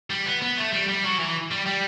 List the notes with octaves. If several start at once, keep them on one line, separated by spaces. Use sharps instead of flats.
G3
B3
B3
A3
G3
G3
F#3
E3
G3
G3